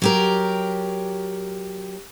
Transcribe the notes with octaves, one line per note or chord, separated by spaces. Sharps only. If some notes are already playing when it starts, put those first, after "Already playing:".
F#3 G4 A#4